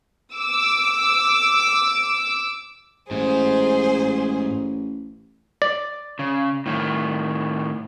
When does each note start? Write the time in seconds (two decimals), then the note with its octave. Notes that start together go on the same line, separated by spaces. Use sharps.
0.33 D6 E6
3.11 A1 G#2 G#4 C5
5.62 D5
6.19 C#3
6.66 A2 D#3